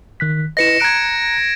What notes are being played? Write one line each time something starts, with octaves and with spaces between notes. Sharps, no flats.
D#3 F#6 B6
E4 B4 D#5 A#6 C#7 E7
A#5 F#6 G#6 A#6 D7